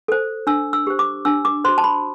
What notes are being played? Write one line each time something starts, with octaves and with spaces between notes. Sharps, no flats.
A4 C5
D4 E6
E6
G4 C5
D6
D4 E6
D6
F#4 C5 C6
A5
B5